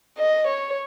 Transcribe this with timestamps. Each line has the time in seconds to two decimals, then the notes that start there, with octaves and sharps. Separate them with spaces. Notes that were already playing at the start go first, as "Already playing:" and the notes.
0.18 D#5
0.47 C#5